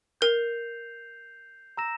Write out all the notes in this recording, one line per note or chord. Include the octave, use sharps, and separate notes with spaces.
A#4 G6 C7 F7
A#5 E6 A#6 E7